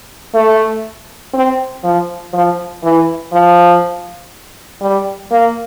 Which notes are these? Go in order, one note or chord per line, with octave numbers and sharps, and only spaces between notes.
A3
C4
F3
F3
E3
F3
G3
A#3